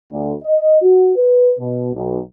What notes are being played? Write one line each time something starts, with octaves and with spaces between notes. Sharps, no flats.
D2
D#5
F#4
B4
B2
B1